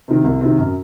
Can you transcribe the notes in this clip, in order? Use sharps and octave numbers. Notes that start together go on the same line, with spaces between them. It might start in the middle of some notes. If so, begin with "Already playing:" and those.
C3 D#3
C2
C3 D#3
F#2